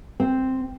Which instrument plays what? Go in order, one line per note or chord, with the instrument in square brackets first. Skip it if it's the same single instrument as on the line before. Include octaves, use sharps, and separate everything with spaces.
[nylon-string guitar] C4